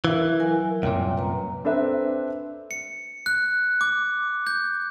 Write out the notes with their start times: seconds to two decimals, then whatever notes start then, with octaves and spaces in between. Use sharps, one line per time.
0.05 E3 A#4 E5 F5
0.40 F#3 A#4 G#5
0.83 C2 F#2 A#2 G5
1.18 B4 A#5
1.65 C4 D4 A4 B4 C5 E5
2.71 C#7
3.26 F#6
3.81 D6
4.47 G6